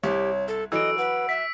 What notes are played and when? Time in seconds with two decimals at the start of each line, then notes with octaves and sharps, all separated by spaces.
0.04 C2 G4 C#5
0.48 A4
0.72 E3 F#3 A4 D#5 E6 D7
0.98 B4 F#5
1.29 E5 B6